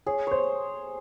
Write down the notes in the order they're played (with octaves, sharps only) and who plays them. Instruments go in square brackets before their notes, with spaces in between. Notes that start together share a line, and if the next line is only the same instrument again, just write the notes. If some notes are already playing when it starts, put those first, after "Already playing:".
[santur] G#4 [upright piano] C#5
[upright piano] C5 [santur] C#5